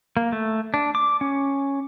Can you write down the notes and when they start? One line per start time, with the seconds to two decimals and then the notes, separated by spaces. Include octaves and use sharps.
0.17 A#3
0.32 A3
0.74 D4
0.95 D6
1.21 C#4